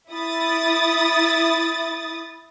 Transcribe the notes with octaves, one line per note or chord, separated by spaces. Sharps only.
E4 D#6 A6